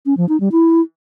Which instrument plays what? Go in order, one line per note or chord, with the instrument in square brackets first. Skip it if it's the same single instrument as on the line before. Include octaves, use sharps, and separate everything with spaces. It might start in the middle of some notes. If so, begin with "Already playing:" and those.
[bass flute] C#4
F3
D#4
G3
E4